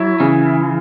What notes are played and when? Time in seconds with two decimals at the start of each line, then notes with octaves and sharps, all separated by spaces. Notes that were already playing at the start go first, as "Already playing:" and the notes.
Already playing: F#3 E4
0.20 C#3 E3